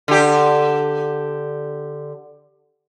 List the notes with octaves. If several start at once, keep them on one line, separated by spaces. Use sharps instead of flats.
D3 G4